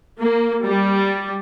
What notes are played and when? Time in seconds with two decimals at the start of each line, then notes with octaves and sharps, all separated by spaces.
0.20 A#3
0.65 G3